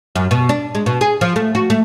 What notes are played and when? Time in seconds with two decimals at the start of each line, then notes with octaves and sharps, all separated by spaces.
0.16 F#2
0.31 B2
0.49 D4
0.75 G#3
0.86 B2
1.01 G#4
1.21 F3
1.36 A3
1.55 F#4
1.70 A3